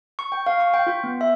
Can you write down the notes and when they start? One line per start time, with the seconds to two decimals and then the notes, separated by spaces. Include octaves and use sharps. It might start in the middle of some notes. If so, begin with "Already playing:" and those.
0.19 C#6
0.32 G5
0.46 F5
0.60 C#6
0.74 G5
0.87 F4
1.04 B3
1.21 E5